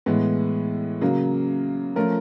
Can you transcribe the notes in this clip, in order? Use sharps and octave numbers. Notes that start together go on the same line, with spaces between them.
A2 E3 G#3 B3
C#3 F#3 A#3
F3 A3 C#4 F4 A#4